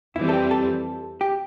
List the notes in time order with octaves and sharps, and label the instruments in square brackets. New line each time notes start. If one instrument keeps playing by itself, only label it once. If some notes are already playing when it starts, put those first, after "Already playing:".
[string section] F2 E3 G3 C4 [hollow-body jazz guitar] E4
[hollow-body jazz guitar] A4
G4
A4
G4